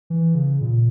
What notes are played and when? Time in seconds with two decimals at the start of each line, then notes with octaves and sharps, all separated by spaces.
0.10 E3
0.35 C#3
0.61 A#2